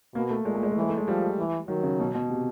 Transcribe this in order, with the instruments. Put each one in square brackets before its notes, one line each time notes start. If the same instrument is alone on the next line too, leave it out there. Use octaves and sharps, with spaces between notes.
[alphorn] B2 [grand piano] A#3
[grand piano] A3
[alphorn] A#2 [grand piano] G#3
[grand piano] A3
G#3
A3
[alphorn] E3 [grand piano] G#3
[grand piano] A3
G#3
[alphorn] F3 [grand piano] G3
[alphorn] E3
[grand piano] D#3 [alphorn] F#3
[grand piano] C#3
B2
B2
C3